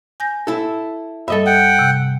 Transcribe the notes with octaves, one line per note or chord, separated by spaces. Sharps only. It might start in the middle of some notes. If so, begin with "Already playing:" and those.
G#5 G6 A#6
E4 A4
G2 G3 A4 D#5 E5
F#5 G5
C3